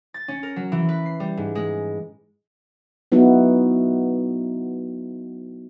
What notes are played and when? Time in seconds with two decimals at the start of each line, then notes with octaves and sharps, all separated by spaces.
0.14 A6
0.28 C#4
0.43 A#4
0.56 F#3
0.72 E3
0.89 B4
1.06 C7
1.20 G3
1.37 G#2
1.55 G#3
3.12 F#3 B3 D#4 E4 F#4